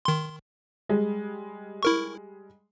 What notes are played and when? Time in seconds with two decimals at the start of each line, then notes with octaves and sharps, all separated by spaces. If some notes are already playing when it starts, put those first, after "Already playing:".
0.05 D#3 C6
0.89 G3 G#3
1.83 E4 A#4 C#6